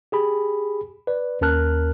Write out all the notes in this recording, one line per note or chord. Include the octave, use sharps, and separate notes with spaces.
G4 G#4 B5
B4 D5
D#2 C#4 A#4 A5 F6 F#6